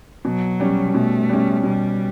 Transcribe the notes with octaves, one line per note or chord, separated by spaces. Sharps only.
B2 F#3
G3 C#4
B2 A3
G3 C#4
B2 G3